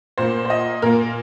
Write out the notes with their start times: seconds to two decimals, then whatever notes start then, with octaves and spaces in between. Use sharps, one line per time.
0.18 A#2 A#3 C5
0.45 C5
0.50 D#5
0.82 A#2 A#3 A#4